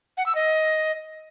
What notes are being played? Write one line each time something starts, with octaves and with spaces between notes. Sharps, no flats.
F#5
E6
D#5